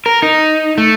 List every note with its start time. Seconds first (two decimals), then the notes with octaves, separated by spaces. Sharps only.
0.06 A#4
0.22 D#4
0.78 A3